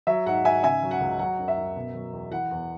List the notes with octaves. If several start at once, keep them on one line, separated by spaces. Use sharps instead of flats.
F#3 E5
G#2 F#5
G#2 E5 G#5
C#3 E5 G#5
F#3
F#5
C#2
F#3 F#5
F#2
E5
F#2
B2
F#3
E2
E3 F#5
E2